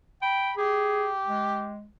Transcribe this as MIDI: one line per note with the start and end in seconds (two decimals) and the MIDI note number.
0.22 0.51 79
0.22 0.57 83
0.57 1.75 67
0.57 1.10 68
1.27 1.86 56